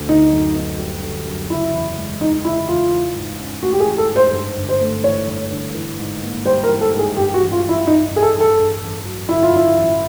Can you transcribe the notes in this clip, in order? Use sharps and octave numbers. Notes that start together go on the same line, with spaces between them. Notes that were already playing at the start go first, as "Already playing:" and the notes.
Already playing: D2
D3 D#4
F#2
B3
G3
D3
F#2
C#3 E4
E2
G#3
E3 D#4
C#3 E4
E2 F4
E3
G#2
C#4
A3 F#4
G4
G#4
E3
A4
G#2
C5
G2
G1
C5
A3
E3 C#5
G2
G1
E3
G#2
A#3
G3 C5
A#4
E3
A4
G#2
G#4
G2 G4
F#4
A1
F4
A1
E4
E3 D#4
G2
G#4
A4
A1
A4
G2
A1
F#3
D3 E4
F4
G2 E4
A1